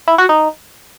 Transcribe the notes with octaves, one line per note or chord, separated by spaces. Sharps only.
E4
F#4
D#4